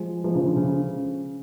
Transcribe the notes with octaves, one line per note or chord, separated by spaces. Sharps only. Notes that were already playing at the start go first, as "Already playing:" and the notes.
Already playing: F3 G#3
F3 G#3
C#3 F3
D3
C#3